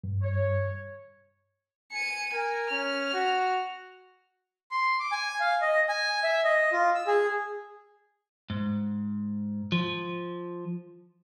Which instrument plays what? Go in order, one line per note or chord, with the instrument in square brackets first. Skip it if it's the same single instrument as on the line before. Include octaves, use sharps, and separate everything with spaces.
[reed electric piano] G2
[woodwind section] C#5
[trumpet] G#5 [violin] C#7 D#7
[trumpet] A#4 [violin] G#5
[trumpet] C#4 [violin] F6
[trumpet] F#4
[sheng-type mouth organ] C6
D6
G#5
F5
D#5
G#5
E5
D#5
F4
E6
G#4
[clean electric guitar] G#2
F3